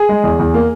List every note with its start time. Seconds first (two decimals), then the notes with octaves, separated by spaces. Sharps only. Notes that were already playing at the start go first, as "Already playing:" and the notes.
Already playing: G#4
0.09 G#3
0.24 E2
0.39 E2
0.54 A#3